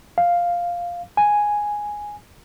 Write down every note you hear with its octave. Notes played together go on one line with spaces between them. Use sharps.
F5
G#5